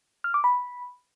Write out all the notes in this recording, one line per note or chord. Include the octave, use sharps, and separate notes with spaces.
F6
D6
B5